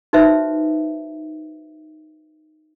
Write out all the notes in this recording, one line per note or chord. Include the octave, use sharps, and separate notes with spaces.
D#4 F#4 B4 C5 E5